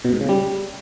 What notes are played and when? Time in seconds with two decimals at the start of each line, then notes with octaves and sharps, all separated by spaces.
0.05 B2
0.13 G#2
0.21 C#3
0.29 G3